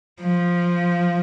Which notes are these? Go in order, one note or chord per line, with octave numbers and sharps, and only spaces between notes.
F3